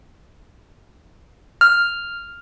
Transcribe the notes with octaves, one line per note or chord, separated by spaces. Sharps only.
F6